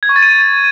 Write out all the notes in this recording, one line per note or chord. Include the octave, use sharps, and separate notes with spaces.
G#6
C#6
A6
D#7